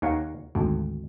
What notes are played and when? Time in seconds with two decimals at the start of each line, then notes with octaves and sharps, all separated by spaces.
0.02 D#2 D#3 C#5 F5 F#5 A#5
0.55 G#1 D2